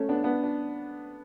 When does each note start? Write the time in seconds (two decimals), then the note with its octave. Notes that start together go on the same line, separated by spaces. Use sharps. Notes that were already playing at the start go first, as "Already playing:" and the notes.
Already playing: A3 C#4
0.09 B3 D4
0.24 B3 D4
0.43 D4